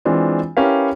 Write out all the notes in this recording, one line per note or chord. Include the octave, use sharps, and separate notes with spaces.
E3 G#3 C4 D4 F4
C#4 E4 G4 A#4 B4 F5